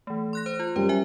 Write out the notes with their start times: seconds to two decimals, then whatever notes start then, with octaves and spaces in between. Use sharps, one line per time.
0.07 E3 A3
0.33 C6 F#6 A#6
0.46 C5
0.59 F4
0.76 F#2 G3 C5
0.89 E5 G#5